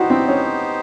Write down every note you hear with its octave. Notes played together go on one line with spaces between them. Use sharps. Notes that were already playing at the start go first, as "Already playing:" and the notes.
Already playing: B3 D#4 E4 F#4 G4 C5
C4
C#4